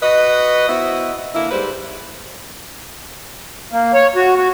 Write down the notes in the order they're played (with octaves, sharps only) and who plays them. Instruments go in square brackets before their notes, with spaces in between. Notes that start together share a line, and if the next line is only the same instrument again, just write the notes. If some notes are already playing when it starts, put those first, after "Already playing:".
[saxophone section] F#4 B4 D#5
B3 E4 F#4 C5 D#5
D3 A#3 E4
G#2 G3 B4 C5
[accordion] A#3
C#5
F#4
F#4